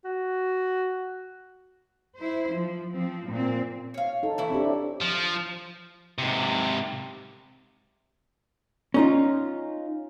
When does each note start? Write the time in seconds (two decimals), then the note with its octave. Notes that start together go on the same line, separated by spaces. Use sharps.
0.05 F#4
2.16 E4 C5
2.50 F3
2.95 F3 C4
3.28 A#2 C4
3.94 C#5 F5
4.23 D#4 A4
4.38 E3 E4 C#5
4.50 C4 D4 G4
5.02 F3
6.18 G#2 C3
8.94 C#4 D#4 F4